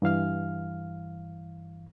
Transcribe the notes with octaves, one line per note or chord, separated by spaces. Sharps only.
G2 E3 F5 F6